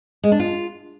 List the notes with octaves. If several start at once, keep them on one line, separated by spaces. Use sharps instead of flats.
G#3
D4
F4